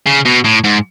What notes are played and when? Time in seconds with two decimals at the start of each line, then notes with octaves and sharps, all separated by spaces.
0.06 C#3
0.25 B2
0.44 A2
0.64 G#2